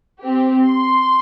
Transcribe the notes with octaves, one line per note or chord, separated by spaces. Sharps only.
C4 G4
C6